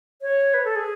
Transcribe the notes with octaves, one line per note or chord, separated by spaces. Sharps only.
C#5
B4
A4
G#4